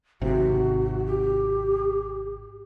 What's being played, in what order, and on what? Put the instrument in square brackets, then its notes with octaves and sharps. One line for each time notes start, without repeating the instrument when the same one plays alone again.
[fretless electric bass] G#1 C3 [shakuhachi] F#4
[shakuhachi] G4